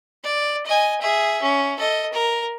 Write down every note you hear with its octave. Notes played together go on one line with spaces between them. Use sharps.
D5
D#5 G#5
G#4 E5
C#4
A4 D#5
A#4